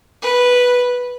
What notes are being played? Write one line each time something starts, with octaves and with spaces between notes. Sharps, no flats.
B4